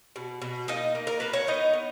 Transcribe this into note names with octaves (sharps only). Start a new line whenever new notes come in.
B2
B2
A#3 D#4 D#5
A#3
A#4
A#3 B4
C#5
B3 D#4 D#5
B3